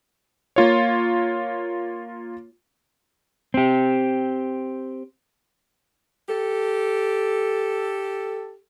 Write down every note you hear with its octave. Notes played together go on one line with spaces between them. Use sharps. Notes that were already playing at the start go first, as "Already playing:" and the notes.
A#3 F4 C#5
C4 G4
G4 A4